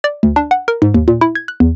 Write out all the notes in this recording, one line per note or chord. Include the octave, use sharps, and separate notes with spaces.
D5
D2
D4
F#5
A#4
G#2
D#2
A#2
E4
G#6
F#6
E2